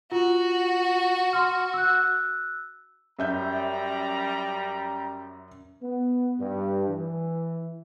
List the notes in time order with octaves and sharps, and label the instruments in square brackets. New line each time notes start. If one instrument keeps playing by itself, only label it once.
[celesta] F4 [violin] F#4
[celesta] C6 F6
E6 F#6
[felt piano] F#2 E5 G6 [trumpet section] G3 A#5
[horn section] B3
G2
E3